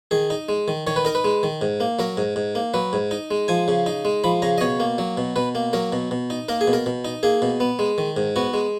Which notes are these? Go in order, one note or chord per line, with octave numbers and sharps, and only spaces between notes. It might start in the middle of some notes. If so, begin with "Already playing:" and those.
D#3 G#4
D#4
G#3
D#3
D#3 C#5
B4
D#4 A#4
B4
G#3
D#3
G#2
A#3
F#3 A#4
G#2
G#2
A#3
F#3 B4
G#2
D#4
G#3
F3 G#5
C#3
D#4
G#3
F3 B5
C#3 A#5
D#5
B2 C#5
A#3
F#3
B2
B2 B4
A#3
F#3 A#4
B2
B2
D#4
A#3 A#4
G#4
B2
A#4
B2
D#4
A#3 G#4
B2
B3
G#3
D#3
G#2
B3 F#4
G#3